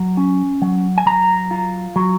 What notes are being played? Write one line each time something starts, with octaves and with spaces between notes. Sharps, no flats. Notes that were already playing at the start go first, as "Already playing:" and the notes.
Already playing: F#3
C#4
F#3
G#5
F#3 A#5
F4
F#3